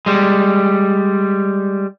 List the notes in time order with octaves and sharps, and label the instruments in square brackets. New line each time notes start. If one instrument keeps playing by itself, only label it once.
[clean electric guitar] G3 G#3